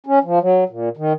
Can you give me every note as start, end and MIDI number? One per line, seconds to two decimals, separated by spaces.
0.06 0.19 61
0.24 0.39 53
0.41 0.64 54
0.69 0.89 46
0.97 1.13 51